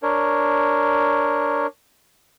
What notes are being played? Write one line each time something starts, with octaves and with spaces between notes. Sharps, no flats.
D4 A#4 C#5